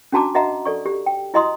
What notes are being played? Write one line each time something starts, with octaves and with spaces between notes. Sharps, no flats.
C#4 D4 F#4 A5 A#5 D6
F#4 D#5 E5 F#5 A#5
A4 D5 C#6
G4
G5
E4 F#4 D#5 A#5 C6 D#6